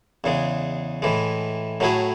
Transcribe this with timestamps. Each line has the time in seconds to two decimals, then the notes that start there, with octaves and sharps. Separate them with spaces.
0.24 E2 C#3 G#3
1.02 A2 E3 G#3
1.80 A2 F#3 A3 E4 G#4